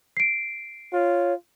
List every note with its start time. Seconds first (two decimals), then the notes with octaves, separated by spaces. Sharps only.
0.17 C7 D7
0.93 F4 C#5